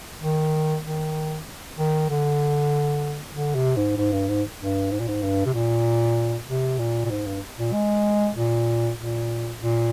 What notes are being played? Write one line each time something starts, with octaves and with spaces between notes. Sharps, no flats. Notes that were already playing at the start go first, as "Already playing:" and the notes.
D#3
D#3
D#3
D3
D3
C3
G#2
G#2
G2
G#2
G2
G#2
A#2
G#2
G2
C3
A#2
C3
A#2
A#2
G#2
G2
A#2
G#3
A#2
A#2
A#2